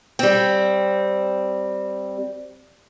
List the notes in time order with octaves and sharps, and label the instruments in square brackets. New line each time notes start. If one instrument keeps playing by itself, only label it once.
[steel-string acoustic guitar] G3 C4